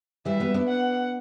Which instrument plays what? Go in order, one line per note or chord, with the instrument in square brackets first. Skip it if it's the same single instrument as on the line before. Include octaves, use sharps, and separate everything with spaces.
[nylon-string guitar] E3 G3 [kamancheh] E5
[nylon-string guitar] G3 B3
B3 D4
[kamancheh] F#5